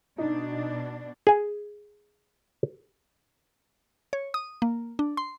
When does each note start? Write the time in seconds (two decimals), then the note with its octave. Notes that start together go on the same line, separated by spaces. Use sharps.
0.18 B2 D4 D#4
1.27 G#4 G#5
4.13 C#5
4.34 D#6
4.62 A#3
4.99 D4
5.17 C6